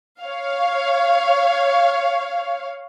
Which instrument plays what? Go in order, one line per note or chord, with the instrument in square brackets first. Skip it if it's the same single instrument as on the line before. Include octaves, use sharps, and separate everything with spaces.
[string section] C#5 F5